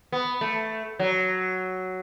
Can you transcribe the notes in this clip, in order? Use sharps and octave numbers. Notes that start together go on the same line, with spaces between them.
B3
A3
F#3